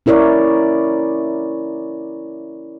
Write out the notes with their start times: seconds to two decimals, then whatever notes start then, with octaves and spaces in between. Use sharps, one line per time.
0.06 C#4 E4 A#4 C#5 D5